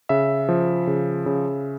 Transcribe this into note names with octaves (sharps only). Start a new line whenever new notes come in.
C#3 E5
F3
C#3
C#3